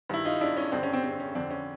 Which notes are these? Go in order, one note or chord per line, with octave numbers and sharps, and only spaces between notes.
G2 D#3 E4
D#4 F4
D4 E4
C#4 D#4
G2 D3 C4 D4
C#4
C4
C4
C#4
F2 D3 C4 D4
C#4